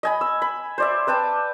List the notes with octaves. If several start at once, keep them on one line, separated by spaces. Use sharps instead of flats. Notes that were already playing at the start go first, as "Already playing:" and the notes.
D#5 G#5 B5
E6
B5
C5 D5 E5
B4 D5 G5 A5